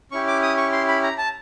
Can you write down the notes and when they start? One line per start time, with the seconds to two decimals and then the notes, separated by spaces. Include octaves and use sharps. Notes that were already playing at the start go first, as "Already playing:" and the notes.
0.12 C#4 E4 G4 C#6
0.27 D6
0.42 D#6
0.57 C#6
0.72 C6
0.88 B5
1.03 A#5
1.18 A5